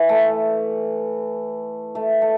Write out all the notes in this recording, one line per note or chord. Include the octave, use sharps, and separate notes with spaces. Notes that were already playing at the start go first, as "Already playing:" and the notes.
Already playing: E3
A3
A3
A3